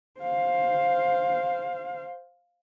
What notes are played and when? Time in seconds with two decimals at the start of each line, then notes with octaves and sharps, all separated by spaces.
0.20 C5 F5